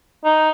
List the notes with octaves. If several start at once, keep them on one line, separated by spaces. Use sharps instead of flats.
D#4